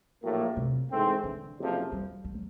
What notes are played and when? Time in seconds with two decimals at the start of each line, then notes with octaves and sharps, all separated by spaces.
0.23 A#1 A2 F#3 A#3
0.57 C3
0.91 G#2 E3 A3 C4
1.24 D3
1.58 F#1 F2 C3 F3
1.92 G3
2.25 G#3
2.34 F#3